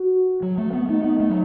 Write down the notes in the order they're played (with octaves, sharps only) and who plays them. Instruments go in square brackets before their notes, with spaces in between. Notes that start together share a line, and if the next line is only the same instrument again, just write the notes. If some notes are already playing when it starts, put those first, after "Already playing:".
Already playing: [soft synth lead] F#4
[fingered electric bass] F#3
A3
B3
[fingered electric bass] A3 [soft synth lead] D#4
[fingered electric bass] B3
A3
F#3